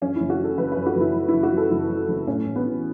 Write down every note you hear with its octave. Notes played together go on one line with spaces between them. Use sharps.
F#2 C#4
F#1 E4
F#4
F#3 A4
F#1 B4
F#2 B4
F#4
F#1 E4
F#3
E4
F#1
F#4
F#2 A4
F#1 E4
F#3
F#1
A2 C#4
A1
B3
E3